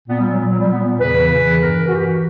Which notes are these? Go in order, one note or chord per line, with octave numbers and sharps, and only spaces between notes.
A#2 B3
G3
F#3
A#2
F#3
G3
A#2 B3
E2 C#3 E3 B4
E2 C#3 E3
G2 E3 A#4
F#4
G2 E3 G4
F#4